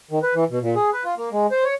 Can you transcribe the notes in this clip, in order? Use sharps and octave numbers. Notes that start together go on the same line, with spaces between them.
D#3
B4
E3
B2
A#2
G#4
B4
F4
A#3
G#3
C5
C#5